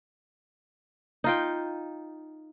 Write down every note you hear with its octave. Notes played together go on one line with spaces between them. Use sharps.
D#4 F4 G5